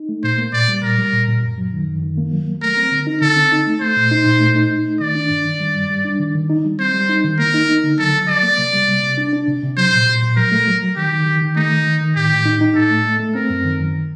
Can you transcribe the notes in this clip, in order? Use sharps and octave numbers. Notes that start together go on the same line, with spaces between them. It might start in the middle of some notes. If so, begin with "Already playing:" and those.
Already playing: D#4
A3
A#2 C5
A#3
A#2 D5
G3
A#2 A#4
G3
A#2
A#2
F#2
F#3
D#3
F#2
D#3
A#3
F#3
F#3
A3 A#4
C4
D3
D#4
D3 A4
C4
D#4
A3
A3 C5
A#2
D#4
A#2
A3
D#4
D#4
A3
D#3 D5
D4
G2
D#3
G3
G2
G3
D4
D#3
D#3
D#4
G3
C4 C5
G3
D#4
D#3
A#3 A#4
D#4
D#4
D3
F#3 A4
F#3
F#3 D5
A#3
C3
G3
C3
C3
D4
D4
C3
C3
F#3 C5
A#2
A#2
A#2
F#3 A#4
A3
F#3
F#3
D#3 G4
D#3
D#3
D#3
A3 D#4
D#3
D#3
D#3
A2 G4
A2
D#4
D#4
A2 A4
A3
A3
A3
C4 A#4
F#2
D#3
F#2